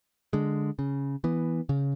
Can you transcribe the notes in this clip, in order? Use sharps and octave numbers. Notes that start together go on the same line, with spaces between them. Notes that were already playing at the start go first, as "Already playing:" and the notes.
D3 G#3
C#3
E3 B3
C#3